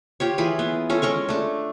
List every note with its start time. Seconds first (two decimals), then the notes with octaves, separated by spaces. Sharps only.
0.20 F4 G4 C#5
0.38 E3 F4 G#4 B5
0.59 B3
0.90 C#4 F4 A4
1.02 G#3 C#4 A#4 C#6
1.29 A3 D4